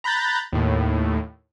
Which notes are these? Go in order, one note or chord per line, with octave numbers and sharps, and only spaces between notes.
A#5 B5 F#6 G6 A6
D#2 A2